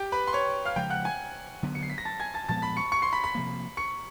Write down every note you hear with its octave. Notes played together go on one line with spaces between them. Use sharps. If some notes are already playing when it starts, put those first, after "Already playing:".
Already playing: G4 G5
B4 B5
C6
C#5 C#6
F5 F6
C#3 F3 G#3 G5 G6
F#5 F#6
G#5 G#6
D3 F#3 B3
C#7
C7
B6
A#6
A5 A6
G#5 G#6
A5 A6
A#2 F3 G#3 B3 A5 A6
B5 B6
C#6 C#7
C#6 C#7
C6 C7
B5 B6
B5 B6
C3 F3 A#3
C#6 C#7